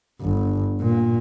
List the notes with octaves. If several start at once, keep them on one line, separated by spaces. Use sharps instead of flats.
G1
A#2